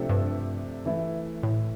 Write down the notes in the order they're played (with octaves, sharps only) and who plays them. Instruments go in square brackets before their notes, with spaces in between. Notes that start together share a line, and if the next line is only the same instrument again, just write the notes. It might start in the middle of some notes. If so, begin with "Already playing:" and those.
Already playing: [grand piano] C3 F3 A3 D4 A4
[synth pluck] G2
[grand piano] E3 A3 E4
[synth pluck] A2